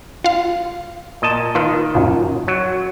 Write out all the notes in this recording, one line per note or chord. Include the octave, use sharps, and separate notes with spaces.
F4 F5
A#2 D#5 A5
D#3 F4 B4
F#2 A#2
F#3